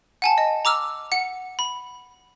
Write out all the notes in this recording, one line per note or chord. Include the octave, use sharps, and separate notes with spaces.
F#5 G#5 A5
D#5
A#5 D6 E6 F6
F#5 C#7
B5